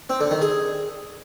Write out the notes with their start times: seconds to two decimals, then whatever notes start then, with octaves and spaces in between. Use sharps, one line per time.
0.10 C4
0.20 D3
0.31 D#3
0.41 G#4